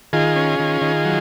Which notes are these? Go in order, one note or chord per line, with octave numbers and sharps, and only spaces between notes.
D#3 F4 G#4
C#4
D#3
D#3
F#3